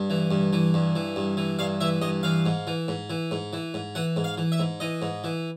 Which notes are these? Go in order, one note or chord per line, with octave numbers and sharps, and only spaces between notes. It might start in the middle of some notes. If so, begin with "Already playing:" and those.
Already playing: G2
E3
G2
E3
G2
E3
G2
E3
G2 F5
E3 E5
G2 D#5
E3 F5
G#2
E3
G#2
E3
G#2
E3
G#2
E3 F#5
G#2
F5
E3
E5
G#2
E3 D#5
G#2
E3